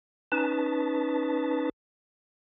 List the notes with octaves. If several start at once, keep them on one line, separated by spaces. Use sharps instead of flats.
C#4 D#4 B4 A5